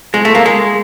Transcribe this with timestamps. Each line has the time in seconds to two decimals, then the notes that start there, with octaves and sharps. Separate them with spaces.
0.14 G#3
0.25 A3
0.35 A#3
0.46 G#3